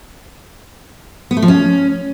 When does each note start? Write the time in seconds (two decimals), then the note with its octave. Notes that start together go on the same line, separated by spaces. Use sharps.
1.31 B3
1.37 A3
1.42 F3
1.48 C#4